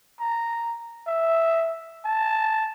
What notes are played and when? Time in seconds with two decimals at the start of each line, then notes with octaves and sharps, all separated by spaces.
0.20 A#5
1.07 E5
2.05 A5